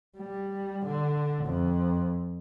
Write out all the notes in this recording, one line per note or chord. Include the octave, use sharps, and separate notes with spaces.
G3
D3
F2